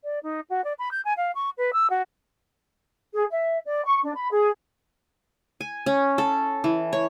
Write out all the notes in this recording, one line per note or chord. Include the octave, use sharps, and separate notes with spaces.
D5
D#4
F#4
D5
B5
G6
G#5
F5
C#6
B4
E6
F#4
G#4
E5
D5
C#6
D4
B5
G#4
G#5
C#4
A4
E3
C#5